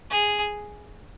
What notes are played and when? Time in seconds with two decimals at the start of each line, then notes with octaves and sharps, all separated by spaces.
0.10 G#4